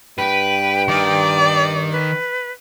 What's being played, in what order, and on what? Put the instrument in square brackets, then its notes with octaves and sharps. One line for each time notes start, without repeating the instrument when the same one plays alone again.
[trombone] G2 [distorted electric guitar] B4 [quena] G5
[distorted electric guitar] D#3 [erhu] D5
[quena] B4